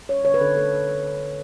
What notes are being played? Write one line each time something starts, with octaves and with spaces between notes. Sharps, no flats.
G3 C#5
D3 C#5
B4
D3 A4
A3 A4